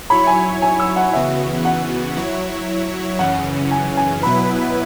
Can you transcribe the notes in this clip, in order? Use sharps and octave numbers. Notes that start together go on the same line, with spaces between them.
F#3 E4 C#5 B5
G#5
G#5
E6
F#5
C#3 E3 B3 F#4 E5
F#5
F#3 E4 C#5
F#2 C#3 E3 C#4 F#5
G#5
G#5
B2 F#3 B3 E4 B4 B5